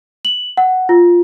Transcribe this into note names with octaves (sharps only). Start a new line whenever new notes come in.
F#7
F#5
F4